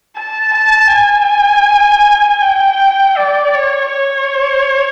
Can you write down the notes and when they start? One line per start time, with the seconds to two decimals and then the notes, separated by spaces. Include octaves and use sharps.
0.17 A5
0.54 A5
0.92 G#5
2.42 G5
3.17 D5
3.54 C#5
3.92 C#5